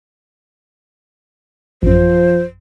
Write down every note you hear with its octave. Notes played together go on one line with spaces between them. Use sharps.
A1 F#2 F3 C5